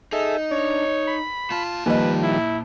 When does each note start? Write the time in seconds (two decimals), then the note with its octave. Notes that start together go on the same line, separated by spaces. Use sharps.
0.13 D#4 G#4 A4 E5
0.51 D4 C#5
1.07 B5
1.51 A#2 F4 A5
1.86 D#3 F3 G3 A#3 B4 D#5
2.23 E4